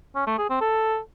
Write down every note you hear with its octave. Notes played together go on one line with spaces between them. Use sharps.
C#4
A3
G#4
C4
A4